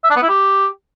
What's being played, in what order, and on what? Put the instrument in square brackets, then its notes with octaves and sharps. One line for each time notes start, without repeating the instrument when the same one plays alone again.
[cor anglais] E5
D4
B3
E4
G4